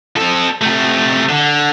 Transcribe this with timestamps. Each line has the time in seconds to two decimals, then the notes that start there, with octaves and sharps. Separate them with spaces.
0.16 C4 A4
0.61 C3 A3
1.29 D3